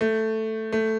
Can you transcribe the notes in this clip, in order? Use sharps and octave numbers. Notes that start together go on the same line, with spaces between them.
A3
A3